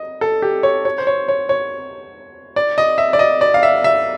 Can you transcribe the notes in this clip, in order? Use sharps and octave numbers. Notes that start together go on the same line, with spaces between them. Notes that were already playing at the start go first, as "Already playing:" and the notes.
Already playing: D#5
A4
G4
C#5
C#5
C5
C#5
C#5
C#5
D5
D#5
E5
D5
D#5
D5
F5
E5
E5